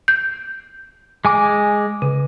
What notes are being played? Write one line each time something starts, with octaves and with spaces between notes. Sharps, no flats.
G6
G#3 G#5 D6
C#3